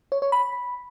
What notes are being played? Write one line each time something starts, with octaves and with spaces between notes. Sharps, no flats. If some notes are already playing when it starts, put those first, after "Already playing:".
C#5
C#5
B5